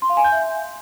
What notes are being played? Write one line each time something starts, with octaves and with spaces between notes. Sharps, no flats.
C6
F5
G#5
G6
E5